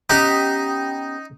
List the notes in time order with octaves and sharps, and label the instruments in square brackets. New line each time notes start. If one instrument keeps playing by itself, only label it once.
[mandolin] B3 G4 [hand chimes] C#4 A#5 [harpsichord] D#4